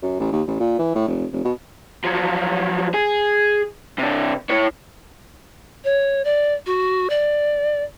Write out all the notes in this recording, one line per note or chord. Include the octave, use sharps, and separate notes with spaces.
F#2
A1
D#2
A1
A#2
E3
A2
F1
F1
B2
F3 F#3
G#4
C3 D4
E4 C#5
C#5
D5
F#4
D5